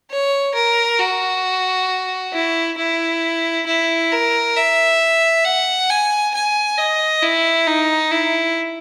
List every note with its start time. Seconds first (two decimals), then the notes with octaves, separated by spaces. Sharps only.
0.11 C#5
0.55 A#4
0.99 F#4
2.33 E4
2.77 E4
3.66 E4
4.12 A#4
4.56 E5
5.45 F#5
5.90 G#5
6.34 G#5
6.78 D#5
7.23 E4
7.67 D#4
8.11 E4